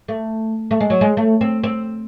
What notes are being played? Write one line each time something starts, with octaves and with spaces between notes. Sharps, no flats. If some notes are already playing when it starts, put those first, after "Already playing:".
A3
A3
G#3
F#3
G#3
A3
C4
C4